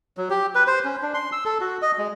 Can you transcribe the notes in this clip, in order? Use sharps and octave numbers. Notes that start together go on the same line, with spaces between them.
F#3
G4
B4
C5
C#4
D4
C6
E6
A4
F#4
D#5
G#3